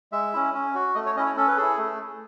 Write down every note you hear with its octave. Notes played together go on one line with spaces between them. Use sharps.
G#3 E5
C#4 E4
C#4
F#4
A3 D#5
C#5
C#4 E4 D#5
C#5
C#4 A4
B4
E4 G#4 A4
A3